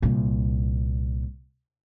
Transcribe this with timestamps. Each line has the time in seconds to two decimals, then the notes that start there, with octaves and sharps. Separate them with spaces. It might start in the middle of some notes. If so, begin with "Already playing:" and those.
0.02 C2 A#2